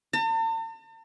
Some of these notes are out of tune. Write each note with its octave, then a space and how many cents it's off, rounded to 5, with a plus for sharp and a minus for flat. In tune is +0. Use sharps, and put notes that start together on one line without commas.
A5 +45